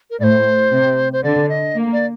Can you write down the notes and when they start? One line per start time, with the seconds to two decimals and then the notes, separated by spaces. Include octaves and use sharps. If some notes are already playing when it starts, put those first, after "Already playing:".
0.10 A#4
0.19 A2 D5
0.24 C5
0.71 C3
1.13 C5
1.23 D3 D5
1.49 D#5
1.75 A#3
1.93 D5